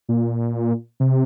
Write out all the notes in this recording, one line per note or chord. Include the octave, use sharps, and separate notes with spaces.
A#2
C3